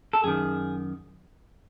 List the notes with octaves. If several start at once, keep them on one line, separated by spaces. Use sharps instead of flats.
A4
F#2 D#3 G#4